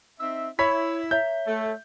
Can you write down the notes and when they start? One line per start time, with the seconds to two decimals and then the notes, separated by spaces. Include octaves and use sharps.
0.20 C4 D#4 E5
0.59 E4 C#5 B5 B6
1.11 C#5 E5 A#5 G6
1.47 A3